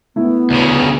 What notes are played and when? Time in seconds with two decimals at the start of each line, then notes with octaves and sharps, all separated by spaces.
0.16 A3 B3 E4
0.50 D2 C#3